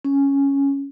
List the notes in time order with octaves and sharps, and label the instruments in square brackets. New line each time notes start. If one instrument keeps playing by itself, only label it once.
[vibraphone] C#4